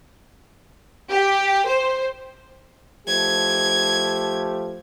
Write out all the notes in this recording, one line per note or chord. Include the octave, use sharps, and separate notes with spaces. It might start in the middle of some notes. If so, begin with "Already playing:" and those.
G4
C5
F3 A3 G4 G#6